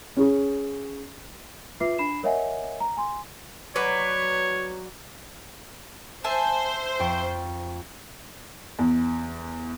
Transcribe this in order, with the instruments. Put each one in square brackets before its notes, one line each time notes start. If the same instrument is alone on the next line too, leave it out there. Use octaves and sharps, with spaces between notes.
[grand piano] C#4 G#4
[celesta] F4 B4 E5 D6 C7
D4 B5 C7 E7
A#4 C#5 D#5 E5 F#5 G#5
A#5
G#5 C6
[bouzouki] F#3 B4 D5 [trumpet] C#5
[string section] C5 [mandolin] E5 G#5 A5
[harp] F2 G5 C#6
[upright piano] E2